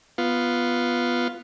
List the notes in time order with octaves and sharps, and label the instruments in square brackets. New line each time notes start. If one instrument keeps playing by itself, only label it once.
[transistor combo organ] B3 F4